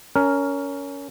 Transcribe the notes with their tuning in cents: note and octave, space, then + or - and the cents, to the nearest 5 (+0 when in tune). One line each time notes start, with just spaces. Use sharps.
C#4 +20 A#4 +0